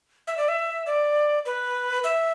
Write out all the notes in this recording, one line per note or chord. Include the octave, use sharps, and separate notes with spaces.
E5
D5
E5
D5
B4
E5